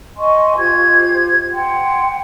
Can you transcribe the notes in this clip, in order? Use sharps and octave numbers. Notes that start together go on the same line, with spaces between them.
D#5 G#5 C6 C#6
F4 G4 C5 G#6
F#5 G5 C6